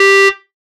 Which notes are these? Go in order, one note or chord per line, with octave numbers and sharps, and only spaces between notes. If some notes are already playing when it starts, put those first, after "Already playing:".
Already playing: G4